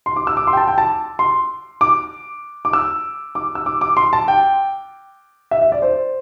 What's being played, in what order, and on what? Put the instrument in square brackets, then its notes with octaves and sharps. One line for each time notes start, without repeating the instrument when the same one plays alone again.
[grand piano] C6
D6
E6
D6
C6
G5
A5
G5
A5
C6
D6
D6
E6
D6
E6
D6
D6
C6
A5
G5
E5
E5
D5
C5